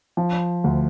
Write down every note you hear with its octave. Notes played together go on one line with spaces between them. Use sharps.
F3
D2